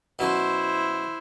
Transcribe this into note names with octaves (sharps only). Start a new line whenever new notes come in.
B2 F#3 C#4 E4 C5